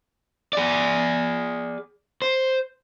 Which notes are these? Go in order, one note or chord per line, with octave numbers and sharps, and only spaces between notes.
G#4 D5
C5